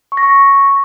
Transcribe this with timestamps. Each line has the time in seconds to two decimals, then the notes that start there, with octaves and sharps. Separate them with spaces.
0.12 C#6
0.17 A#6
0.23 C#6